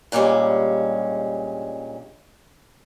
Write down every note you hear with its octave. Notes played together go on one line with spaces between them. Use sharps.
G2 A#2 G3 G#3 C#4